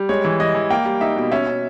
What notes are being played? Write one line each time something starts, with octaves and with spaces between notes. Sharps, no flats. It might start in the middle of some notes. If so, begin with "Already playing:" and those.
Already playing: G3
G#3 C#5
E3
E3 D#5
E3
A#3 G5
G3
D#4 E5
B2
C#4 E5
C#4